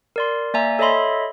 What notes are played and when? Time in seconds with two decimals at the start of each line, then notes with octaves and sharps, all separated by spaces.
0.16 A#4 D5 C6
0.54 A#3 D5 E5 G#5 A#5
0.79 A4 C#5 D#5 E5 B5 C6